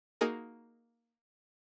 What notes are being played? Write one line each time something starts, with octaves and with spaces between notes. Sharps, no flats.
A#3 D#4 F#4 G#4 A#4